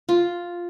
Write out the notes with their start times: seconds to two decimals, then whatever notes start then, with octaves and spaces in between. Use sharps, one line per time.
0.09 F4